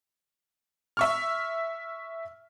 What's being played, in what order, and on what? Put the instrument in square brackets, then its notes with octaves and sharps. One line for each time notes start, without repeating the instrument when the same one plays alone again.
[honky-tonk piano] E5 C#6 F6